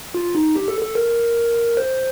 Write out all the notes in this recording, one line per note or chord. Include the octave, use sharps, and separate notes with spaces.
F4
D#4
G4
A4
A4
A#4
C5